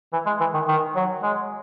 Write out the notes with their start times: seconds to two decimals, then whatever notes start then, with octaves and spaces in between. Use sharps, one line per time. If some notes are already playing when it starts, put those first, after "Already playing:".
0.13 E3
0.26 G#3
0.40 E3
0.54 D#3
0.68 D#3
0.96 F#3
1.23 G#3